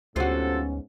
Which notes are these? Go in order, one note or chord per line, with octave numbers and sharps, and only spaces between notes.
D2 G#2 C3 B3 C#4 F4 F#4 A4